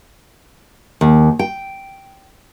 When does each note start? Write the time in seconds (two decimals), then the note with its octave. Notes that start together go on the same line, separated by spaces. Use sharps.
1.01 D#2
1.39 G5